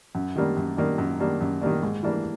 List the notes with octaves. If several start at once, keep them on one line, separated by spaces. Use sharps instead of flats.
F#2
D#3 G3 A#3 D4
F#2
D#3 G3 A#3 D4
F#2
D#3 G3 A#3 D4
F#2
D#3 G3 A#3 D4
G#2
E3 G3 A#3 D4